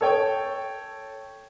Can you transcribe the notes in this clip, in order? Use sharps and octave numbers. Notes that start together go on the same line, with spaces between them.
A4 C#5 G5